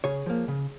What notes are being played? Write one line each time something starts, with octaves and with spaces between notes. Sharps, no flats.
C#3 G#4 C#5
F3 A#3
C#3